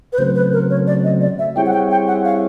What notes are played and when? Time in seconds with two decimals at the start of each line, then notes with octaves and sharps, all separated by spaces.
0.13 B4
0.18 C#3 F#3 A3 C4 C5
0.35 B4
0.53 A#4
0.70 C#5
0.87 D5
1.04 D#5
1.21 D5
1.39 E5
1.56 G3 C4 E4 G#4 C#5 G5
1.66 F#5
1.73 G5
1.91 G5
2.07 F#5
2.25 F5